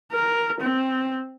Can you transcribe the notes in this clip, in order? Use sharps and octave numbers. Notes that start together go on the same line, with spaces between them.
A#4
C4